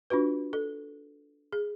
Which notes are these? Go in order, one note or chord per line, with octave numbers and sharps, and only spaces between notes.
D4 F4 F#4 B4
A4
G#4